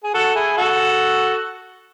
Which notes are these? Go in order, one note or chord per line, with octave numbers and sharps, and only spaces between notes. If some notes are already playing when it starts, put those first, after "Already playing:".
G#4
F#4 A4
E4 G#4
F#4 A4